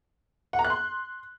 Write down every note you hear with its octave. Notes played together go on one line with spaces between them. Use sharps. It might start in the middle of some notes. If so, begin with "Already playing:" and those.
F#5
A#5
F#6
C6